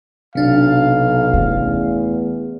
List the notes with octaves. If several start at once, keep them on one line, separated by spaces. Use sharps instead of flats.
B1 C3 D4 F5
E2 A3 C#4